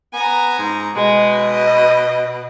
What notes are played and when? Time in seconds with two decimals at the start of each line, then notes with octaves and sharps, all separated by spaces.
0.13 B3 G#5 A#5
0.59 G#2
0.96 B2 G#3
1.51 D#5